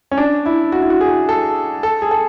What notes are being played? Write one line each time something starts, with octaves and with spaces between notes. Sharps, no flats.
C#4
D4
E4
F#4
E4
F#4
G#4
A4
A4
G#4
A4